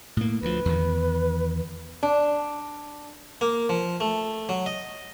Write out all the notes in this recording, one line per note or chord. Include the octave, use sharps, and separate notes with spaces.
A2 A#3
D2 F3 B4
E2 D#3
D4
A#3
F3
A3
F#3
D#5